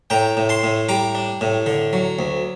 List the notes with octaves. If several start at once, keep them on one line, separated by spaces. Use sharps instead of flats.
A2 G5 A#5
A2
A5 C6
A2
G3 A#5 D6
D4
A2
D3
F#3
D2